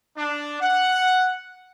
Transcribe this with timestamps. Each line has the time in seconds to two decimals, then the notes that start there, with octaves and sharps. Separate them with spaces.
0.17 D4
0.61 F#5